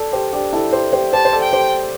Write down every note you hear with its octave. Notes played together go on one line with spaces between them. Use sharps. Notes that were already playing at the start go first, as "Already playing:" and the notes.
Already playing: A4 D5
G4 C5
D4 G4
E4 A4
G4 C5
G4 C5
G4 C5 A5
C5
A4 D5
G5
G4 C5